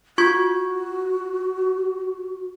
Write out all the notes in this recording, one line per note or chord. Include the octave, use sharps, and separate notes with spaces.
F4 F#4 C#6 G#6